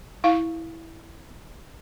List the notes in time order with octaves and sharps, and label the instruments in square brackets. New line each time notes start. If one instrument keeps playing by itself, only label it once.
[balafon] E4 F5